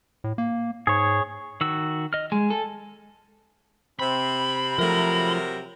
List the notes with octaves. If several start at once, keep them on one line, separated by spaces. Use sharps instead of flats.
A2
A#3
G#2 G#4 C#5
D#3 F#4 E6
D#5 F6
G#3 G#5
A4
C3 C4 B5
C3 F3 F#3 A3 A#4